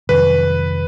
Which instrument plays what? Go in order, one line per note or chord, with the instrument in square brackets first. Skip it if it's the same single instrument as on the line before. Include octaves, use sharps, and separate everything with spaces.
[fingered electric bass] F2 C3 D#3 F#3 [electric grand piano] B4